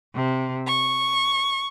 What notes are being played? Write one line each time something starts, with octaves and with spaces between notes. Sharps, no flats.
C3
C#6